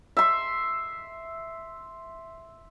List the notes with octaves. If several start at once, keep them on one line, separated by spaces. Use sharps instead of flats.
E5 C6